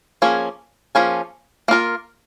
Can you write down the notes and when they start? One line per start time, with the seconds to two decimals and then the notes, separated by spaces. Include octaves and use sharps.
0.22 F3 A#3 C#4 G#4
0.95 F3 A#3 C#4 G#4
1.68 A#3 F4 A#4